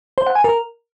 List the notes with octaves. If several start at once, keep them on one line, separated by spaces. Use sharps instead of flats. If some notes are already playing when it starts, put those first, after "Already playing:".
C5
F#5
G#5
A#4